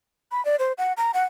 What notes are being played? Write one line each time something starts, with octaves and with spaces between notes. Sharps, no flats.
B5
D5
C5
F#5
A#5
F#5